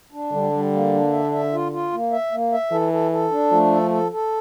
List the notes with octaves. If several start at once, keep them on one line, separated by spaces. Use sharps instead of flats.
D4
D3 G3
G3
A#3
D4
E5
E5
F4
F4
A#3
E5
A#3
E5
E3 A4
A4
A4
D4
F3 A3
A4
A4
A4